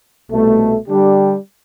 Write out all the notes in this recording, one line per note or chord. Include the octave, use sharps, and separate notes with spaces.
C2 B2 A3
D3 G3 D4 G4